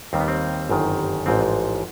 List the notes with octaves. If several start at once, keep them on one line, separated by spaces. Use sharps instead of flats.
D#2 D#3 G3 C4
B3
C4
G1 F#2 D#3
A1 G#2 F3 C4